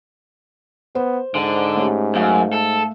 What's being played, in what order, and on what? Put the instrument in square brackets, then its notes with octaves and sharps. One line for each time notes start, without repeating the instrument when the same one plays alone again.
[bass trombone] B3 [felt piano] C5
[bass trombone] G#2 [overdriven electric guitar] D3
[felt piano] A3 C#4 G4
[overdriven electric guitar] F#2 [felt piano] A3 F5
[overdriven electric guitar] A4